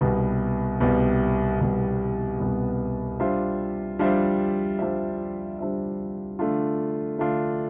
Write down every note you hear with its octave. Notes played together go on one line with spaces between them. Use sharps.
C2 B2 G3 B3
C2 B2 G3 B3
C2 B2 G3 B3
C2 B2 G3 B3
G3 D4 F4 C5 E5
G3 D4 F4 C5 E5
G3 D4 F4 C5 E5
G3 D4 F4 C5 E5
D3 A3 D4 F4
D3 A3 D4 F4